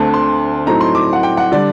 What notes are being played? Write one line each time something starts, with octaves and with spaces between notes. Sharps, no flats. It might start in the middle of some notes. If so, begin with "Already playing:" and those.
Already playing: D2 D3 A3 C4 A5
C6
A2 F#3 A3 C4 D#4 A#5
C6
D6
F#5
G5
F#5
D3 G3 D5